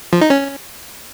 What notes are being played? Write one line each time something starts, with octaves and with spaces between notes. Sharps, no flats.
F3
D#4
C#4